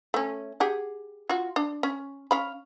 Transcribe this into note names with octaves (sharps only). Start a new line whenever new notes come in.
A3 C#4
G4 G#4 F#5
F4 F#4
D4
C#4
C#4 F5 B5